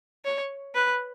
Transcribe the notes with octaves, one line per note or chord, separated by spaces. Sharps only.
C#5
B4